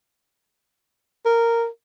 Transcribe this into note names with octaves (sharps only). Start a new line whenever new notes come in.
A#4